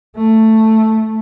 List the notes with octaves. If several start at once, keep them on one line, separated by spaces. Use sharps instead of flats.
A3